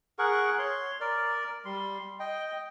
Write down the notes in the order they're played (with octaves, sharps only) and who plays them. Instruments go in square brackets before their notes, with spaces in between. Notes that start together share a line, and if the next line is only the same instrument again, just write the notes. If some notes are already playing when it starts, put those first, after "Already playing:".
[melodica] G#4 A#4 F#5 C#6
C#5 C6
A#4 D5
G3 C6
D#5 G5